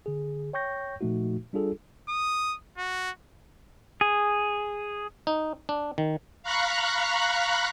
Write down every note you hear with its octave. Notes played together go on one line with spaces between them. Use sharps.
D3 G#4
C#5 G5 C#6 G6 A#6
A#2 F3 A3 D#4 F#4
G3 D4 F4 G#4 A4
D#6
F#4
G#4
D#4
D4
D#3
F5 A#5 B5 C#6 F#6